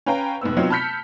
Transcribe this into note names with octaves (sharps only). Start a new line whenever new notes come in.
C#4 B4 F5 G5 A#5
F1 G#2 B3 E6
F#3 B3 C4 D#4 F4
A5 B5 F6 G6 B6 C#7